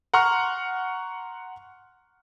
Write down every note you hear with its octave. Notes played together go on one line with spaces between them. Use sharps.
F#5 A#5 C6 C#6 F6 F#6